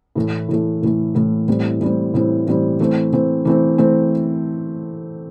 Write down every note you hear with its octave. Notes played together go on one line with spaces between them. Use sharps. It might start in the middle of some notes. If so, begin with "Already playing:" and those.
A2 E3 A3
A2 E3 A3
A2 E3 A3
A2 E3 A3
A2 E3 G3 C4
A2 E3 G3 C4
A2 E3 G3 C4
A2 E3 G3 C4
E3 A3 C4
E3 A3 C4
E3 A3 C4
E3 A3 C4